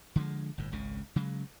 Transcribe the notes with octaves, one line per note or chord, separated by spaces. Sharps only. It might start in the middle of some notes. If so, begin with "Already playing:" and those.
D3 F3 G#3
G1 A2
G#1 C#2 C#3
C#3 F#3 G#3